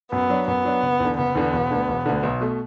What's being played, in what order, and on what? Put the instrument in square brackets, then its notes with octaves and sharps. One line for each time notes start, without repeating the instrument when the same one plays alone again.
[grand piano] F#2 [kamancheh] B3
[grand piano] F#3 D4
[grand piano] F#2 [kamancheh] B3
[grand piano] F#3 D4
F#1
E2 D3
[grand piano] F#1 [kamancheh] B3
[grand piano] E2 D3
E1
D2 D3
E1
D2 D3
B1
B2 A3